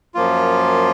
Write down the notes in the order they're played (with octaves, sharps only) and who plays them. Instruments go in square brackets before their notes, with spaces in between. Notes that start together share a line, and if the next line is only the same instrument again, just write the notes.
[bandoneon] F#2 F3 A#3 F4